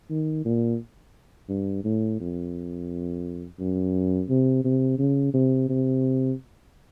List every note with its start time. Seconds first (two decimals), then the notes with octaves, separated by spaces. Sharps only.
0.10 D#3
0.45 A#2
1.49 G2
1.84 A2
2.20 F2
3.59 F#2
4.29 C3
4.64 C3
4.99 C#3
5.34 C3
5.69 C3